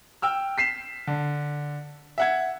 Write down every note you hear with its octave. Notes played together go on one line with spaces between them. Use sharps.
G5 E6 F6
B6 C7 E7
D3
E5 F#5 G#6